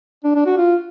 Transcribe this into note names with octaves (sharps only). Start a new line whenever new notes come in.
D4
D4
F#4
F4